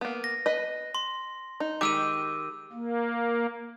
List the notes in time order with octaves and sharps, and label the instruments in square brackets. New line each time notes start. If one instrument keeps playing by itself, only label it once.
[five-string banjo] A#3 B3
[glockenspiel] A#6
[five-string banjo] B4 D#5
[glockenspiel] C6
[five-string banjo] D#4
[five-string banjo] D#3 G#3 G4 [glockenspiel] D6 E6 D#7
[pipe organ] A#3